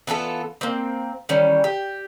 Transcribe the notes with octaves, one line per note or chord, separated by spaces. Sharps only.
E3 B3 F4 A4
A#3 C4
D#3 E3 G3 C#4
G4